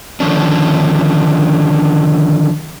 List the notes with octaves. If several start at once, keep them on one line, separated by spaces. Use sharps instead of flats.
D3 D#3 F3 C#4 D4